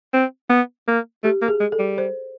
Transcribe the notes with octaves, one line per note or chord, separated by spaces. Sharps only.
C4
B3
A#3
A3 G4
A#3
G#4
G#3
A4
G3
C5